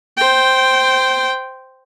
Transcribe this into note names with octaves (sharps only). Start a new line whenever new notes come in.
C5 G5